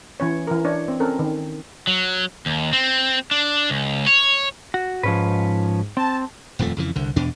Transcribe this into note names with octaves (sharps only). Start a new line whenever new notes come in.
E3 C#4 C#5
E3 A#4
D4 C#5
C4
C4 C#4 A4 A#4
D#3
F#3
D#2
C4
D4
C#2
C#5
F#4
G#2 F3 C#4 B4
C4 A5
D#1 F2 F3 A3
F2 C#3 E3
C2 D3
E2 B2 D4